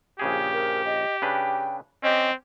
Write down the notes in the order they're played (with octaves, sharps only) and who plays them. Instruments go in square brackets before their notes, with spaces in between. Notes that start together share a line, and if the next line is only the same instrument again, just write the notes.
[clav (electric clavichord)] A#1 C#3 G#4 [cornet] G4
[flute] A#4
D#5
[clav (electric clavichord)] C#3 D4 B4 [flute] G5
[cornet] C4 [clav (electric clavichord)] C#4 G4 [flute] D#5